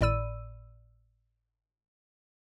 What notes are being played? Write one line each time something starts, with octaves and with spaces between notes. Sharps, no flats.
G#1 A2 D5 B5 E6 D#7